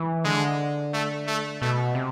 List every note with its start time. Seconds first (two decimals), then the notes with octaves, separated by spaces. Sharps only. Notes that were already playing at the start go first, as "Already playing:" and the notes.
Already playing: E3
0.25 D3 G#3
0.93 A3
1.27 A3
1.62 B2 A3
1.95 C3